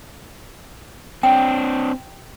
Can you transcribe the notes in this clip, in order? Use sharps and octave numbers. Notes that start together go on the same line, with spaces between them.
C4 D4 G5